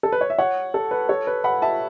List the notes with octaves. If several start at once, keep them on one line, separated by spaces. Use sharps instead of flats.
A4
B4
C#5
E5
C#5 F#5
A4
B4
A4 C#5
B4
F#5 B5
E5 A5